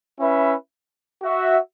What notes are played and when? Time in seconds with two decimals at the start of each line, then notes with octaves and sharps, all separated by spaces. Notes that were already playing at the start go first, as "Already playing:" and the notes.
0.19 C#4 E4 B4 E5
1.23 F#4 E5